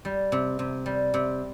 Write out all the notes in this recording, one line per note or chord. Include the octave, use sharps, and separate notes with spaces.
G3
C3
C3
G3
C3